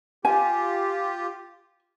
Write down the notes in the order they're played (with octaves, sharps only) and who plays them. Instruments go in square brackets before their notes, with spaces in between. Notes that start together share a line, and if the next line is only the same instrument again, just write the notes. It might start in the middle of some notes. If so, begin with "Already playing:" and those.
[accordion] F4 G4 [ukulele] G#5